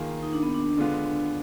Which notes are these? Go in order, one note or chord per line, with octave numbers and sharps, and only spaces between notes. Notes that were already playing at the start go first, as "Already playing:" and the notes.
Already playing: D#3 A#3 F4 G#4
D#4
D4
B3
D4
D3 G#3 B3 F4